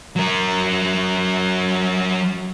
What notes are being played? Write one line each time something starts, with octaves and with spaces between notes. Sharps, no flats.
F#3 A#4